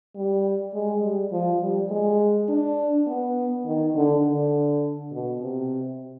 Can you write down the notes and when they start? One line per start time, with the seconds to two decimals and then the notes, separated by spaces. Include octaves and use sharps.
0.16 G3
0.74 G#3
1.02 G3
1.32 F3
1.62 G3
1.91 G#3
2.49 D4
3.07 B3
3.65 D#3
3.95 D3
4.24 D3
5.12 B2
5.41 C3